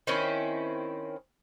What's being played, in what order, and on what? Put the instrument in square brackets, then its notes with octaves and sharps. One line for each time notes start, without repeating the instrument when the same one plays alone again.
[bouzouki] D#3 C4 C#4 E4